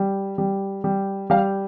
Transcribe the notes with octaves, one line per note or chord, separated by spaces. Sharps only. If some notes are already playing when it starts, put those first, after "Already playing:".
Already playing: G3
G3
G3
G3 F5